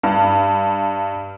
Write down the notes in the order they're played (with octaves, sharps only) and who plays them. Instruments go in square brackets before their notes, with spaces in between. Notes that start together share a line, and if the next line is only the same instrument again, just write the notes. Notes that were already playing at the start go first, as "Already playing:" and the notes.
[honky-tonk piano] G2